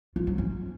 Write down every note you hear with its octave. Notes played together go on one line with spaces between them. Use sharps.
F4
F#3
C#4